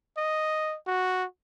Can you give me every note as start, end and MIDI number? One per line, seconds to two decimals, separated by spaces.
0.17 0.76 75
0.87 1.25 66